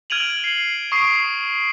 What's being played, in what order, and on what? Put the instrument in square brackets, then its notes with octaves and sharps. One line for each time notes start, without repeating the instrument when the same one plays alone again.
[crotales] F6 G#6 D7 D#7 F7 F#7
C7 F#7
C#6 D#6 C7 D7